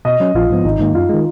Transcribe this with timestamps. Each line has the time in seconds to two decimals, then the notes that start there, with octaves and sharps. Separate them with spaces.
0.05 B2 D#5
0.20 F#3 C#4
0.35 A#1 F4
0.50 G#2 F3 B3
0.65 G#1 D#4
0.80 G#2 D#3 A#3
0.94 F#2 F4
1.09 D#3 G#3